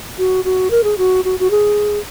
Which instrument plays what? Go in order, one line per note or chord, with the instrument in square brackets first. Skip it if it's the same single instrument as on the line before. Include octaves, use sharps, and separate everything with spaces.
[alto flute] F#4
F#4
A#4
G#4
F#4
F#4
F#4
G#4